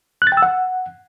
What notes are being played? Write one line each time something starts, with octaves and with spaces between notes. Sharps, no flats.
F#6
A6
G5
E6
F#5